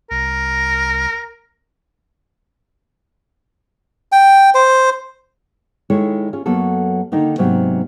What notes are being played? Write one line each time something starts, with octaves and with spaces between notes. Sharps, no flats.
C2 A#4
G5
C5
D#3 G#3 E4 A4 C#5
C#4 F4 G#4
F#2 F#3 A#3 B3 A4
D3 D#3 A#3 D#4
G#2 C3 F#3 A#3 B3